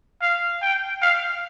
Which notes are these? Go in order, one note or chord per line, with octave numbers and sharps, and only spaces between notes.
F5
G5
F5